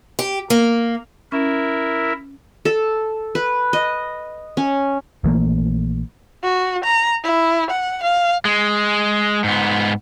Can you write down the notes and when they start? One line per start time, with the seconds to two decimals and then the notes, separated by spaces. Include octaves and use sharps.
0.19 G4
0.50 A#3
1.32 C#4 E4 A#4 E5
2.65 A4
3.35 B4
3.73 D#5
4.57 C#4
5.24 A#1 E3 A3 A#3
6.43 F#4
6.84 A#5
7.23 E4
7.70 F#5
8.03 F5
8.45 G#3
9.44 G#2 B3